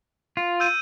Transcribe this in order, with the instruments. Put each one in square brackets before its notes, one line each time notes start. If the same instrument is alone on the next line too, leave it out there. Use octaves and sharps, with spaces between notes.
[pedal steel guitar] F4
[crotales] E6 G6 D#7